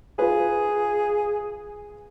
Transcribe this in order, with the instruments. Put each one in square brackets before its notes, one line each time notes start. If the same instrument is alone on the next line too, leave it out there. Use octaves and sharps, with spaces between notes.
[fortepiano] F4 B4 [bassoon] G#4